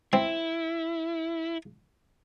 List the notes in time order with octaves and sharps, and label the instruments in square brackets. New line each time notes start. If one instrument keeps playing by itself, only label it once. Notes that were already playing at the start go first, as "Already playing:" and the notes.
[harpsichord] C4 [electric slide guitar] E4